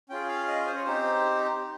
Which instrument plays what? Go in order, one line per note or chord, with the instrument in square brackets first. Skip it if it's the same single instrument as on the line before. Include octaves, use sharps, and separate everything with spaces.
[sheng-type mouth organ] C#4 F4 G#4 G5
F5
D#5
C5
C#5
C4 D#4 G4 C5